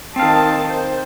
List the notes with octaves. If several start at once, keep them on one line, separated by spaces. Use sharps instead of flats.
D#3 C4 D#4 F5 A5
C5